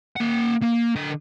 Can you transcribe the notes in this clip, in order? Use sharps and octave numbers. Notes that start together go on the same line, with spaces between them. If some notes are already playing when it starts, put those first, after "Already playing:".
A#3 F#5
A#3
D3 D#5